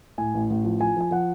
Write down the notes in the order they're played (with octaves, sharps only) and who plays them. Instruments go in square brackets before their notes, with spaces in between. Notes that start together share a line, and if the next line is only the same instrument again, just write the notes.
[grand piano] A2 G#5
A1
A1
F3
F3 G#5
F3 G#5
F3 F#5